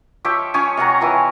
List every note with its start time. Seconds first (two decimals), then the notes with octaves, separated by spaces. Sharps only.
0.24 F3 G4 C#5 E5
0.54 F3 C#4 C#5 G#5
0.77 C3 C#5 F#5 A#5
1.01 E3 F3 F5